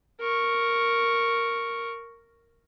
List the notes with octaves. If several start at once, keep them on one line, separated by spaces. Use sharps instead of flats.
A#4 C#6